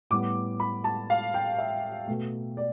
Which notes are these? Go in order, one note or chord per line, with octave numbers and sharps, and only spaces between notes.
A2 G3 B3 D6
B5
A5
F5
G5
E5
B2 A3
D5